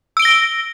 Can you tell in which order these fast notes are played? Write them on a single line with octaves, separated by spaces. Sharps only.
E6 D7 G7 A#6